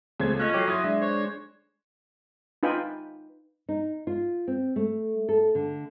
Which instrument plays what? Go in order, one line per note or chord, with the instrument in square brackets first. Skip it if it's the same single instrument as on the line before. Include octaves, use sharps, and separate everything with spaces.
[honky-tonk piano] C#2 A4 G#6 [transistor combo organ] A3 C4 G#4
[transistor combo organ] A3 [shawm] C#4 [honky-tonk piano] F4 D#5 [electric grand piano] F#6 A#6
[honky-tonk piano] F#3 A4 [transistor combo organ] C#5 G5 [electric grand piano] D6 C7
[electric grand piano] F#3 E4 [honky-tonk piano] C6 G#6 A#6 [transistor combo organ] D#6
[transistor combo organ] G#3 D4 [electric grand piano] E5
[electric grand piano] C5 [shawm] C#5
[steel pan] D#4 F4 B4 G5 G#5 B5
[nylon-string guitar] D#4
F4
C4
A3
A4
D3